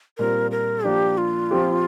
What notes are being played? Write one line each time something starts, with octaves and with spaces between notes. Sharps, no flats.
A#2 G3 C4 A#4
A#4
F3 A#3 D4 G4
F4
F3 C4 G4